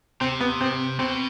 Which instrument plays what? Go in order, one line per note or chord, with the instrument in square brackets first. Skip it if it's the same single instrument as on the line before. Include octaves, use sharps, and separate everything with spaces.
[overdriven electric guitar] C3 [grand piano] C4
[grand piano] B3
C4
[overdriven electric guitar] B2 [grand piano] C4